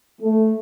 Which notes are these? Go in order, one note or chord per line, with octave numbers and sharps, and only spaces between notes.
A3